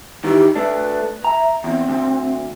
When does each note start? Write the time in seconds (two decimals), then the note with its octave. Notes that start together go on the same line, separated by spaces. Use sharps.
0.24 D#3 E3 G4
0.55 A3 D4 B4
1.25 E5 A#5
1.64 E2 C4
1.88 D2